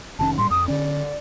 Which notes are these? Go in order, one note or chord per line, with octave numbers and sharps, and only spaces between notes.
F1 D#3 C#4 A5
A2 G3 C6
F2 D#6
D3 C#4 D5